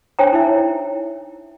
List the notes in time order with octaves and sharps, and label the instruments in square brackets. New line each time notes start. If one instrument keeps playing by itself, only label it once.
[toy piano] D4 C5 C#5 G5 G#5 A#5
D#4 E4 E5